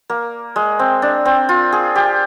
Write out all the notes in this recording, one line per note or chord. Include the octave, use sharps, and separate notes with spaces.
A#3
G#3
C4
D4
C4
F4
G#4
G4